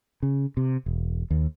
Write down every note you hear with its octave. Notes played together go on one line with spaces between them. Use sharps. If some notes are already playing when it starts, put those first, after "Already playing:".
C#3
C3
E1
D#2